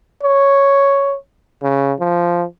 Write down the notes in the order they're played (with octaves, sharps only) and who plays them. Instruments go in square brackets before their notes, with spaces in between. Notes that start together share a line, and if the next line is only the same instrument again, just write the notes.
[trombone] C#5
C#3
F3